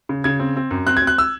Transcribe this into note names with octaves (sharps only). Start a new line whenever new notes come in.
C#3
C#3 G#6
C4
C4
F#2
C4 F#6
G#6
C4
F#6
E6